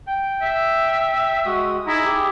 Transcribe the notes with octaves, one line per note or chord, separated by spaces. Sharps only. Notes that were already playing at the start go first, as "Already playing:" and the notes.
G5
E5
G#3 F#4 D#6
D#4 E4 G#4 A#5
G4 G#4